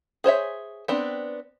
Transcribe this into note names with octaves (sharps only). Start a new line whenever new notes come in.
G#4 C5 C#5 E5
B3 C4 D4